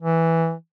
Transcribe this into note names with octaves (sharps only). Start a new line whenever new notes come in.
E3